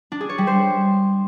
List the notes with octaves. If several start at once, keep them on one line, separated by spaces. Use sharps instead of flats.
D4
G#4
C#5
G3
C5